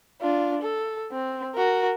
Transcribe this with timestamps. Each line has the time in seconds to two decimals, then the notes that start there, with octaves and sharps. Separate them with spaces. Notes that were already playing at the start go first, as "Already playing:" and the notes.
0.21 D4 F4
0.62 A4
1.12 C4
1.55 F#4 A#4